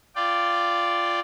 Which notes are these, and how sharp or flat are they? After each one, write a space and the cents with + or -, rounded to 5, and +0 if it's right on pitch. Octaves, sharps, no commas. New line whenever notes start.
F4 -10 D5 +0 G5 +0